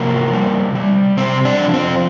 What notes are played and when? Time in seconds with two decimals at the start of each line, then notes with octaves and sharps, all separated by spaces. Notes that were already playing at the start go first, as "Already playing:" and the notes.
Already playing: C3 F3 A#3 A#4
0.33 G3
0.75 G3
1.17 C3 C4 C5
1.45 D4 D5
1.59 F3
1.73 C4 C5